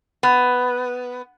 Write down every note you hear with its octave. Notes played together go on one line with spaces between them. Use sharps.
B3